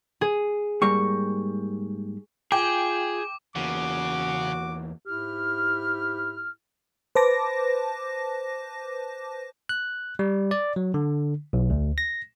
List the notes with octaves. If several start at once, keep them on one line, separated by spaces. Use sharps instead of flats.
G#4
G#2 G3 A#3 C#6
F4 G#4 G5 D6
E2 C#3 A#3 F#4 D6
G#2 E4 G4 F6
B4 C5 A5 D6 A#6
F#6
G3
D5
F#3
D3
B1
D2
A#6